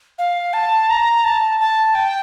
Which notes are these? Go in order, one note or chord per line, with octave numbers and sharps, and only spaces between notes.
F5
A5
A#5
A5
A5
G5